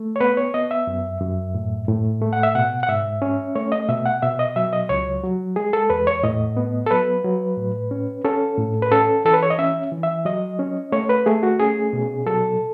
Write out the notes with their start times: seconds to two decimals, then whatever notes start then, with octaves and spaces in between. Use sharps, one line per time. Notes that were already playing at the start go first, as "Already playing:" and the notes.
Already playing: A3
0.16 C#5
0.21 B3 B4
0.37 C#5
0.54 B3 D#5
0.71 E5
0.87 F#2
1.21 F#2
1.54 A2
1.88 A2
2.21 A3
2.33 F#5
2.43 E5
2.55 B2 F#5
2.83 F#5
2.88 G#2 E5
3.22 C#4
3.55 A3 C#5
3.72 D#5
3.88 B2 E5
4.06 F#5
4.22 B2 E5
4.39 D#5
4.56 F#3 E5
4.73 D#5
4.89 C#2 C#5
5.24 F#3
5.56 G#3 G#4
5.73 A4
5.90 E2 B4
6.07 C#5
6.23 A2 D#5
6.57 B3
6.87 A4
6.91 F#3 B4
7.24 F#3
7.57 A2
7.91 C#4
8.25 C#4 A4
8.58 A2
8.82 B4
8.92 C#4 A4
9.25 E3 A4
9.34 B4
9.43 C#5
9.50 D#5
9.59 C#4 E5
9.91 E3
10.03 E5
10.25 F#3 D#5
10.59 C#4
10.92 A3 C#5
11.09 B4
11.26 A3 G#4
11.43 F#4
11.59 C#4 G#4
11.93 B2
12.26 F#3 A4